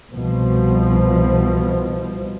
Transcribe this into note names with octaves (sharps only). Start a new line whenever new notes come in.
C2 B2 F3